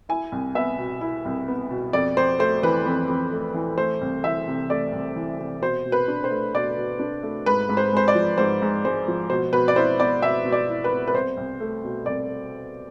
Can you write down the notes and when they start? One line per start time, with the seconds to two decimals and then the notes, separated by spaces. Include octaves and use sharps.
0.09 E4 G#5
0.32 C2
0.55 B3 E5
0.78 B2
1.01 E4
1.25 C2
1.48 B3
1.71 B2
1.93 F2 D5
2.17 F2 C5
2.39 A3 C5
2.63 E3 B4
2.86 F2
3.08 F2
3.32 A3
3.54 E3
3.77 A3 C5
4.01 C2
4.24 E3 E5
4.47 C3
4.70 A3 D5
4.92 C2
5.16 E3
5.39 C3
5.61 B2 C5
5.86 B2
5.92 B4
6.08 D4
6.24 C5
6.31 A3
6.54 B2 D5
6.78 B2
7.00 D4
7.23 A3
7.46 G#2 B4
7.69 G#2
7.77 C5
7.92 G#3 C5
8.08 D5
8.15 F3
8.38 G#2 C5
8.62 G#2
8.85 G#3 C5
9.08 F3
9.30 B2 C5
9.53 B2 B4
9.68 D5
9.76 E4 C5
10.00 B3 D5
10.22 B2 E5
10.45 B2
10.52 D5
10.69 E4
10.84 B4
10.91 B3
11.08 B4
11.14 C2 C5
11.37 C2
11.61 A3
11.84 B2
12.06 C2 D5